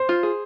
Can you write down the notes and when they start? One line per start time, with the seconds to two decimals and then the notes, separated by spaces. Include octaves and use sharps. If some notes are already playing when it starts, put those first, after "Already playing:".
Already playing: C5
0.09 F4
0.23 G#4